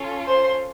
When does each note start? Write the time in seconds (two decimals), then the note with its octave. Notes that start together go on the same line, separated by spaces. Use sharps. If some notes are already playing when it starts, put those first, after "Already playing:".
Already playing: C#4 F4 A4
0.26 C5 C6